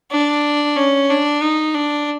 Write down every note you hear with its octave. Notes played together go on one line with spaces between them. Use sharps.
D4
C#4
D4
D#4
D4